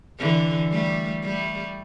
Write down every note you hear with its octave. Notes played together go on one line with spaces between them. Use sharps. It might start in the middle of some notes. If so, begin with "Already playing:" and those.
D3 E3
G3 A3
G3 A3